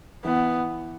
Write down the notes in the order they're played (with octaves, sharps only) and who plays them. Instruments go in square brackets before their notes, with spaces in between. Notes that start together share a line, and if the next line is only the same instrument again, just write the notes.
[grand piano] E3 [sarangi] B3